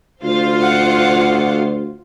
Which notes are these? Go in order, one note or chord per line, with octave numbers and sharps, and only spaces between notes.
D2 F4 C5 F5
F#5